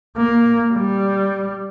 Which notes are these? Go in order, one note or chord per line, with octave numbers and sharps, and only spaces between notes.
A#3
G3